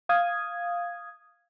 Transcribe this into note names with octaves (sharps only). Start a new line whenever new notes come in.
F5 D#6 G#6